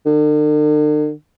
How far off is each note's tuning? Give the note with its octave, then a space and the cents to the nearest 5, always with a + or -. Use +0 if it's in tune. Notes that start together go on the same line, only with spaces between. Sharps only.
D3 +45